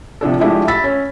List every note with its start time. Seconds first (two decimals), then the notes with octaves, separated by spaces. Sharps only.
0.21 C3 F3 D4 A4
0.40 F3 G#3 A3 D4 E4 G4
0.68 B5 E6 A6 B6
0.84 C#4